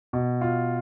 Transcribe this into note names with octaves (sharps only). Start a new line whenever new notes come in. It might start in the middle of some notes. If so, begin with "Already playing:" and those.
B2
F4